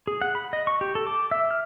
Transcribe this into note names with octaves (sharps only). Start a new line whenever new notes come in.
G#4
F#5
B5
D#5
C#6
G4
A4
D6
E5
F6